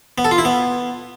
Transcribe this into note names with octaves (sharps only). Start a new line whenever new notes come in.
B3
A4
F4
E4
B3